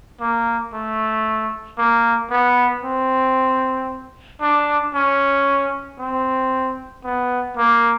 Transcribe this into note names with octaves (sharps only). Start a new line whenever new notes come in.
A#3
A3
A#3
B3
C4
D4
C#4
C4
B3
A#3